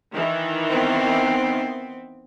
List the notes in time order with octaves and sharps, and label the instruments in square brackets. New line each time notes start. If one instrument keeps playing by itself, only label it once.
[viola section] D#3 E3
[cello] B3 C4